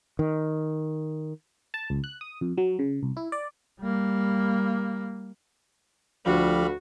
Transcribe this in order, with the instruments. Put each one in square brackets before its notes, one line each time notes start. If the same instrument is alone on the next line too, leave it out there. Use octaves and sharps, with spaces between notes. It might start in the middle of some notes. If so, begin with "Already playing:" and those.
[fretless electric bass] D#3
[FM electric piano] A5
C#2
F#6
D#6
F2
F#3
C#3
C2
E4
D5
[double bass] G3 A#3
[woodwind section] D2 [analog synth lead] F3 [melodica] G3 F5 B5 [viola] F#4